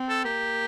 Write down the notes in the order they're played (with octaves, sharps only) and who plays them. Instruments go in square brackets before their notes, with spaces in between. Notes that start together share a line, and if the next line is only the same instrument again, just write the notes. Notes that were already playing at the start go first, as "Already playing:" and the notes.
Already playing: [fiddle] C4
[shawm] A4
[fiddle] A#3 [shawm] G4